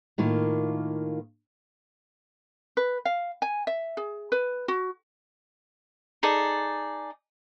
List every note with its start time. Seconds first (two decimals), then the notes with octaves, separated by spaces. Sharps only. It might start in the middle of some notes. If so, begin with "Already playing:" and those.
0.18 A2 D#3 A#3 F4
2.77 B4
3.05 F5
3.42 G#5
3.67 E5
3.97 G#4
4.32 B4
4.68 F#4
6.23 D#4 G#4 A4 D5